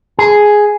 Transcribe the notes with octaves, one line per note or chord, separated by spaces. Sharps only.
G#4